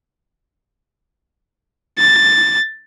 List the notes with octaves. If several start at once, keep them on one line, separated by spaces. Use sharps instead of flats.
A6